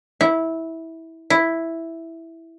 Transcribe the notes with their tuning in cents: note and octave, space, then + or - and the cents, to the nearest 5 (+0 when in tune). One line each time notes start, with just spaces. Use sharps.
E4 -15
E4 +0